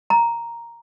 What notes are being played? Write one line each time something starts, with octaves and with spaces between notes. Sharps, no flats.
A#5